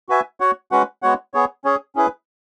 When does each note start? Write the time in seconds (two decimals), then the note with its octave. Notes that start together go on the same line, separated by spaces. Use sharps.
0.09 F#4 B4 E5 G#5
0.40 F#4 C#5 F#5
0.71 G#3 C#4 F#4 B4 F#5
1.02 G#3 B3 F#4 C#5 F#5
1.34 B3 G#4 C#5
1.65 C#4 G#4 C#5
1.96 C#4 E4 G#4 B4